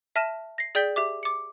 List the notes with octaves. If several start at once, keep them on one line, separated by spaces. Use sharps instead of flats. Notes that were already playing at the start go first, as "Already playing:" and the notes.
E5 A5 F6 A#6 D#7 E7
A#6 C7
G#4 D5 G5 G6 B6 G7
G4 E5 D6
D6 C#7